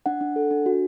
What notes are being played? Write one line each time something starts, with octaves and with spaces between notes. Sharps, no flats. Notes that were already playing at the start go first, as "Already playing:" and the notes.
D4 F#5
D4
A4
D4
F#4